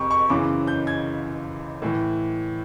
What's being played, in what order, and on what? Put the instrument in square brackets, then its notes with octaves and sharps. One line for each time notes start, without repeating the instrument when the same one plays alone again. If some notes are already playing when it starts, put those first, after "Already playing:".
Already playing: [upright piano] F2 C3 C#6
C#6
F#2 C#3 E3 D6
G6
G#6
A2 E3